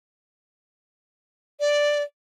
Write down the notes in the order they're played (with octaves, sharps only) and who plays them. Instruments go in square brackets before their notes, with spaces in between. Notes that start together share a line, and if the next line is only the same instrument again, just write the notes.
[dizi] D5